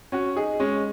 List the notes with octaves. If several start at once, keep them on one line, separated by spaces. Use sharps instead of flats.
C#4 F#4
D#4 G#4
G#3 C#4